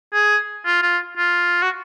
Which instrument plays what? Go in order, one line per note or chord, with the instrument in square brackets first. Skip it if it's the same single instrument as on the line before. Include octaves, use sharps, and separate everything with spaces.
[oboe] G#4
F4
F4
F4
F#4